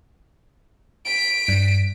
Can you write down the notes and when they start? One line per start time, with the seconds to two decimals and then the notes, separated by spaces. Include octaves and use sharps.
1.06 B6 D7
1.48 G2